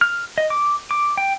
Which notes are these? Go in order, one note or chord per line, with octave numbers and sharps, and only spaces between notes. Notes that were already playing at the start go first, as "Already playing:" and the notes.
F6
D#5
D6
D6
G5